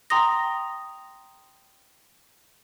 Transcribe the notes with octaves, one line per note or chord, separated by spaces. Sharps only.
G5 A#5 C6 D#6 A#6